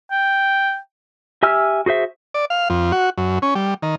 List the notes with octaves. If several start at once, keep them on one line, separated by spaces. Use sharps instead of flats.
G5
G4 E5 G#5 E6 F6
F#4 G#4 C5 E5
D5
F5
F2
F#4
F#2
C#4
G3
D#3